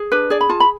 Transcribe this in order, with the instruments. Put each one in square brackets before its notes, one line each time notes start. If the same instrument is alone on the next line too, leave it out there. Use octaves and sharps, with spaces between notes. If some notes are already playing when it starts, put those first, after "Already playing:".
Already playing: [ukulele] G#4
D4 B4
G#4 D5
B5
F4 A5
B5